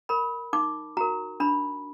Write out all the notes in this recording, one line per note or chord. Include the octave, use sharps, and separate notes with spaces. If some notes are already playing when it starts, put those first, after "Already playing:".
A#4 B5
D#4 D6
F#4 A#4 A#5
D4 B5